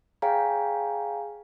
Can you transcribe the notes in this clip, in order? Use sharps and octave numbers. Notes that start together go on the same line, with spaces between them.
G#4 C#5 F5 G5 G#5 A#5